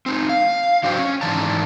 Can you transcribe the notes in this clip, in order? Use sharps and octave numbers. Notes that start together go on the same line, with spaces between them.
C4 D#4
F5
F#3 D4 F#4 C5 G5
C#4
G#2 D#3 E3 D5 A5 A#5